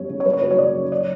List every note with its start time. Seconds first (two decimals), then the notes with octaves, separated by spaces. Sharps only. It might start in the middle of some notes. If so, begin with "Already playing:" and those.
Already playing: F#2 G3 B3 C#5
0.09 C#3
0.20 C#5
0.25 F#1 B4
0.33 C#5
0.42 F#3 B4
0.51 C#5
0.58 C#3 D5
0.75 F#2
0.92 D5